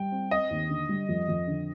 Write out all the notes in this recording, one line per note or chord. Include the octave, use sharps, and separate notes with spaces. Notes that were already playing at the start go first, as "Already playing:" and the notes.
Already playing: G3 G5
C4
C4 D#5
D#2
D3
G3
F2
F2
D3